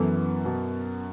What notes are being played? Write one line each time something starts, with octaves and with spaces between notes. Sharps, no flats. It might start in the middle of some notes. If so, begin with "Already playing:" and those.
Already playing: F#2 E3 B3 E4 A4
B2